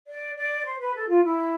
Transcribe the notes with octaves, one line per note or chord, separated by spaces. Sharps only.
D5
D5
C5
B4
A4
F4
E4